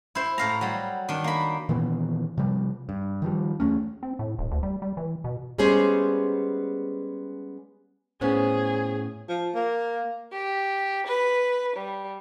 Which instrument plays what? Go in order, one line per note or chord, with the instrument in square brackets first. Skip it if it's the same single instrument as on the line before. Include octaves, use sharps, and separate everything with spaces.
[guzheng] E4 C5
A2 F5 A#5
F#3 G3
D#3 D4
A#3 B5
[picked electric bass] A#2 D#3 E3 B3
C3 F3 G3
G2
D#3 F3 G3
E2 G2 A3 C#4
[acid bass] C4
A2
D#1
D2
G3
G3
E3
B2
[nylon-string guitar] G3 G#3 B3 C#4 G#4 C5
[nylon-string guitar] A2 B3 C#4 [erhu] G#4 [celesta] C5
[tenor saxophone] F3
A#3
[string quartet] G4
B4
G3